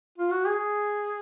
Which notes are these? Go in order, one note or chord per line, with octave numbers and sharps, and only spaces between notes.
F4
F#4
G#4